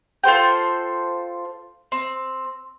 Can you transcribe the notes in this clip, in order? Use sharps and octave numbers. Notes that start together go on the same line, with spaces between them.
F4 A4 C5 G5
C4